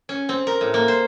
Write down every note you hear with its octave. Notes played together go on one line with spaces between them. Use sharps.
C#4
C4
A#4
A2
A#3
C5